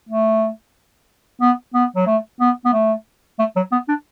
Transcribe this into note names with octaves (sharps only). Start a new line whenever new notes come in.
A3
B3
B3
F#3
A3
B3
B3
A3
A3
F#3
B3
D4